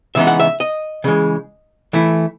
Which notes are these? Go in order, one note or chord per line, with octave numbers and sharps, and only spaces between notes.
C#3 E3 G#3 B3 D#4 E5
F#5
E5
D#5
C#3 E3 G#3
E3 A3 E4